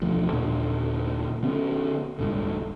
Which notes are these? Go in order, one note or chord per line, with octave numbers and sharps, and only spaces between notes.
E1 D2 F3
D#2 A#2 D3 A#3
D3 B3 C#4
F1 C2 G#2 D3